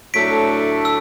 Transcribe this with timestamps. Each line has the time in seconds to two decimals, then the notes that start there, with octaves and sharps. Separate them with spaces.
0.14 A2 F#3 A3 D4 A4 B6 D7
0.85 E6